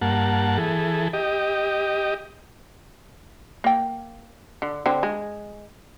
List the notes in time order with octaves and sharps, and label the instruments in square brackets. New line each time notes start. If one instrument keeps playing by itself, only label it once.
[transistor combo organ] G2 A#3 F#5 A5
E3 G#4 A4
G4 D#5
[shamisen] A#3 G5
D3
D3 C4
G#3